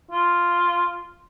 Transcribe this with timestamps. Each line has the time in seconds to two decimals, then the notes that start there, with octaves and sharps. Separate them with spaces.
0.11 F4